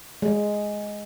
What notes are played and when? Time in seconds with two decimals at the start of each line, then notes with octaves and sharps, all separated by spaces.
0.22 G#3